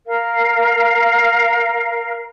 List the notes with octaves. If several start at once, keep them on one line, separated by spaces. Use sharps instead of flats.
A#4 F5